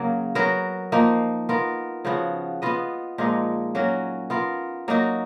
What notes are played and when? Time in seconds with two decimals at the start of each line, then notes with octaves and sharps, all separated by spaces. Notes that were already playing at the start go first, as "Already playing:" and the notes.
Already playing: C#3 F#3 A#3
0.35 F#3 B3 F#4 A#4
0.92 F3 A#3 D#4
1.49 B3 F4 A#4
2.05 C#3 F3 B3 F#4
2.62 B3 F4 B4 D#5
3.18 A#2 F3 G#3 D#4
3.75 F#3 A#3 C#4 F#4
4.30 B3 F4 A#4
4.88 F#3 A#3 D#4 F#4